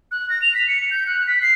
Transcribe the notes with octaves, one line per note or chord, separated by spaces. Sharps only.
F#6
A#6
F7
B6
C#7
G6
F#6
B6
C7